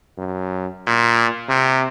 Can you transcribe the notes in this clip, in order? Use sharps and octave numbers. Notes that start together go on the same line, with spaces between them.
F#2
A#2
C3